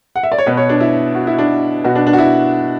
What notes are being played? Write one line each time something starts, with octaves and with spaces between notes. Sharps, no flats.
F#5
E5
D5
C#5
B2 B4
C#5
D4
E4
F#4
E4
D4
B2 F#4
D4
D4
F#4
E4